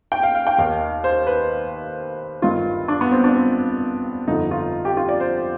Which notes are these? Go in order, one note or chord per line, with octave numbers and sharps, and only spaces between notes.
G5
F5
F5
G5
D#2 D#3 F5
C5
B4
G1 G2 D#3 F4
D4
B3
C4
D4
C4
G1 F2 D3 F3 D#4
F4
G4
F4
D5
C5